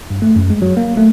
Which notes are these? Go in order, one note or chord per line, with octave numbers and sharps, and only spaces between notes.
G2
A3
F#2
G#3
F#3
A#3
A3